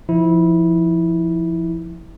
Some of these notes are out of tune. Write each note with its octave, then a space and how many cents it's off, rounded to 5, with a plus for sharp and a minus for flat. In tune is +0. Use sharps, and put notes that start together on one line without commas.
F3 -25 E4 -20